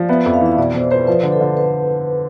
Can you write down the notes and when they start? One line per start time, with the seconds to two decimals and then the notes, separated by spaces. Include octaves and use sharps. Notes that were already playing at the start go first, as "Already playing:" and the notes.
Already playing: F3 D5
0.09 B3 E5
0.21 F2 E5
0.34 F5
0.41 E3 E5
0.57 B2 D5
0.74 B2 C5
0.91 B4 C5
1.07 F3 B4
1.23 D3
1.32 A4
1.41 D3
1.57 B4